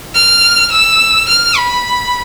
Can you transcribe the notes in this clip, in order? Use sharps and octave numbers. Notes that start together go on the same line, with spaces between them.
F6
E6
F6
B5